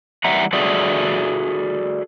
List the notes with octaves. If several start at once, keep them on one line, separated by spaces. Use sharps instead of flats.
E3 G3 E5 F#5 A#5
F#4 G#4 A4 D5 E5 F#5